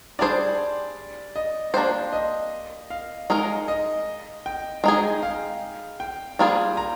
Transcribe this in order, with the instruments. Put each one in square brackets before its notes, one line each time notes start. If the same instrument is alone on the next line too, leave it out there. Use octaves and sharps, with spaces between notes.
[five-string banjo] G3 D4 G#4 C5 [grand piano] D5
[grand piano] D#5
[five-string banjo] A#3 D4 G4 C5
[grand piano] D#5
F5
[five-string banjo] G#3 D#4 A#4
[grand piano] D#5
G5
[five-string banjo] G#3 D#4 G#4
[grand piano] F5
G5
[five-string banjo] G3 A#3 F4 G#4
[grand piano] A#5